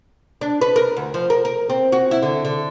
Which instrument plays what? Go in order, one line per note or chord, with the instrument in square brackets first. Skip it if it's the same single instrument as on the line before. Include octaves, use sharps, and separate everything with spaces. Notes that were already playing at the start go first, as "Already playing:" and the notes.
[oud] D4
B4
A#4
D2
F3
A#4
A#4
C4
F#4
E4
D3
D3